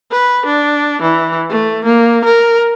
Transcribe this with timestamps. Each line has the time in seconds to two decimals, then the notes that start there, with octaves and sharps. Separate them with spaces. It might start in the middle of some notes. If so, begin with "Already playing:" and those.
0.12 B4
0.46 D4
1.02 E3
1.50 A3
1.85 A#3
2.25 A#4